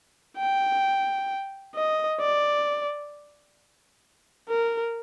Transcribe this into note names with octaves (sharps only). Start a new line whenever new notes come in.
G5
D#5
D5
A#4